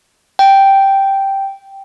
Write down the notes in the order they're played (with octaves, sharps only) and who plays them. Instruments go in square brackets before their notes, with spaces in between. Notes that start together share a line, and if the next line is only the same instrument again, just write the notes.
[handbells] G5